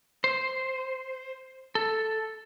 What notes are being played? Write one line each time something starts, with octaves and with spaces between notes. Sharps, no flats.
C5
A4